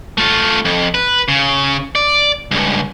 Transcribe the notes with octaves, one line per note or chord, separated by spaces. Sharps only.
A3 F4
F2
B4
C#3
D5
C#2 G2